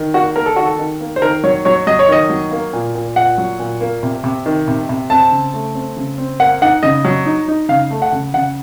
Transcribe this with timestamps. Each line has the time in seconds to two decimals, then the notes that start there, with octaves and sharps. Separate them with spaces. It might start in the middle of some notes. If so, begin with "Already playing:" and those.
Already playing: D#3
0.14 A#3 F#4
0.36 A#3 A#4
0.46 A4
0.56 D#3 F#4
0.66 A4
0.79 D#3
1.01 A#3
1.16 C5
1.22 D#3 A#4
1.43 F#3 C#5
1.65 F#3 C#5
1.87 F#3 D#5
1.99 C#5
2.09 D#3 D#5
2.30 F#3
2.51 A#3
2.73 A#2
2.95 A#2
3.16 A#2 F#5
3.38 F#3
3.59 A#2
3.81 A#3
4.03 C3
4.24 C3
4.46 D#3
4.68 C3
4.89 C3
5.10 C4 A5
5.31 C#3
5.54 A3
5.75 C4
5.97 C#3
6.18 C4
6.40 A#3 F#5
6.62 D#4 F#5
6.83 C#3 D#5
7.04 F#3
7.26 D#4
7.48 D#4
7.69 C#3 F5
7.91 A3
8.02 F#5
8.12 C#3
8.34 C#3 F#5